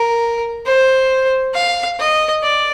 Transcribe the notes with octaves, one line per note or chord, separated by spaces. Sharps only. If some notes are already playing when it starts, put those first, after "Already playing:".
Already playing: A#4
C5
F5
D#5
D5